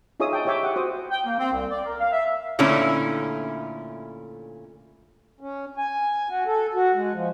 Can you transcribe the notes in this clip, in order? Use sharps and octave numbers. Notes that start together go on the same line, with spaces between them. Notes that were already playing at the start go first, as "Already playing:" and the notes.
D#4 F4 G#4 C#5 E5 D#6
G5 A5
E4 G4 C#5 E5 G5 D6
G4 F#5
F#4 C5 D#6
G5
A#3
C4
C2
D5
A#4
F5
E5
A#2 D3 A3 C#4 E4
C#4
G#5
F#4
A4
F#4
G#3
F3